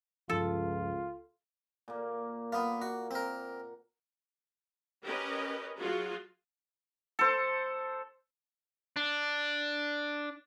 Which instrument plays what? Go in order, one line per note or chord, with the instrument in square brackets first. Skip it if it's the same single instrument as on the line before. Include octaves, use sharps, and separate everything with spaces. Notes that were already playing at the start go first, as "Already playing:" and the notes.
[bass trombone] C#2 [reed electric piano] G2 F3 [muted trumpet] F4 [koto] A4
[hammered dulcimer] A#2 A#3
[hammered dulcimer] A#3 [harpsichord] B3 F4
[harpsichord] F#4 [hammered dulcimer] F#5
[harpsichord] C4 A#4
[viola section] C#4 G4 A#4 B4 D#5
F#3 F4 F#4 G#4
[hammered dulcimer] A4 C5
[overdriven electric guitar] D4